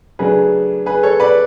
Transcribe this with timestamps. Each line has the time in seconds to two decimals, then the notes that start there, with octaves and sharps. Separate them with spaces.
0.19 C#3 F#3 A3 D4 G#4 B4
0.86 G#4 B4
1.03 A4 C#5
1.20 B4 D5